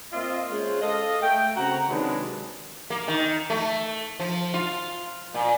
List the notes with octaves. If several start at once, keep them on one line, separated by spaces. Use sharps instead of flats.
A#3 C4 F4 D#5 E5
G#3 C#4 F4 C5 C#5
A4 D#5 F5
A3 G5
C#3 C4 F#4 A#5
C3 D#3 F#3 G#3 D4 B4
A#3
D#3
A3
F3
F4
A#2